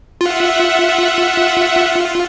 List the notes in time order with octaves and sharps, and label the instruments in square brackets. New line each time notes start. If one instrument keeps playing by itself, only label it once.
[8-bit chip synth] F4 [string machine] E5 F#5